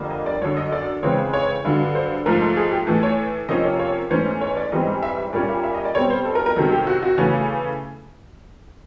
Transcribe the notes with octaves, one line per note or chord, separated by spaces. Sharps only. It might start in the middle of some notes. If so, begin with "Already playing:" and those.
Already playing: F2 D3 G3 A#3
D#5
D5
F#2 D3 F#3 C#5
D#5
D5
C#3 E3 G#3 C4 C#5
C#5
G2 D3 F#3
C5
G#2 F3 A3 A#4
A4
G#4
G4
A2 E3 A3 A4
C#5
C3 F3 A#3 C#4 D#5
C#5
C#5
G#2 E3 A3 C#4 C5
C#5
D5
G#2 E3 G3 C4 D#5
E5
A#2 G3 A#3 C#4 D5
E5
E5
D#5
D5
B2 G3 C4 C#5
C5
A4
A#4
A#4
C3 D#3 F#3 A4
G4
F#4
F#4
C#3 E3 A3 C#4